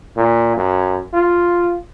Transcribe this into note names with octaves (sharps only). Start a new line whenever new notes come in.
A#2
F#2
F4